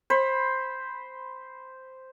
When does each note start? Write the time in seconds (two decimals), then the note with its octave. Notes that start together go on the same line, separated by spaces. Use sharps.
0.10 C5 B5